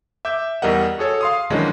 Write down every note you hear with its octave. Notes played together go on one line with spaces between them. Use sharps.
E5 D6 G6
E2 G3 A#4 D#5 F#5
F#4 G#4 A4 C#5
F5 C6 D#6
D#3 E3 F#3 G#3 C#4 D4